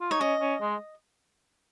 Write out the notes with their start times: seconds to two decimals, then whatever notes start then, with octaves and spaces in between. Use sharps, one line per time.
0.01 F4
0.11 D#4 C#5
0.20 C#4 D#5
0.41 C#4
0.61 G#3